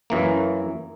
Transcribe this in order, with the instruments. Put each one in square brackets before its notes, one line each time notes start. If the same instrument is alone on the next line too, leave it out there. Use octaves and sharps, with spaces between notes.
[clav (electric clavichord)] F#2 E3 A#3